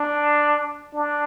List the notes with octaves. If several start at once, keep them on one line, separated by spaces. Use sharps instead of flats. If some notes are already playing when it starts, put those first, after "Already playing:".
Already playing: D4
D4